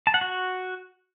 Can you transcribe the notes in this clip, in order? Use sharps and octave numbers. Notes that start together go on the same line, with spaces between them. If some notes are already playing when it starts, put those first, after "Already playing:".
A5
F#5
F#4